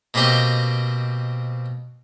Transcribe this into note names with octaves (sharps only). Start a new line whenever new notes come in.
B2 A#3 C4 G4 D#5 G5